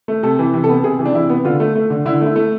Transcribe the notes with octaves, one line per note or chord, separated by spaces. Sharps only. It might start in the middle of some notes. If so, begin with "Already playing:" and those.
A3
C3 A4
E3
C3
A4
B3
C3 G#4
E3
D4
C3 E4
B3
D3 F4
A3
A3
D3
D3 E4
A3
E4
A3